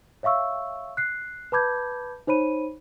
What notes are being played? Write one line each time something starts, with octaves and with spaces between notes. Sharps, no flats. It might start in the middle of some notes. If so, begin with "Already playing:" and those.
C#5 E5 F5 C#6 E6
F#6 C7
B4 A5 B5 D6 G6 G#6
D#4 C5 C#5 B5 D#7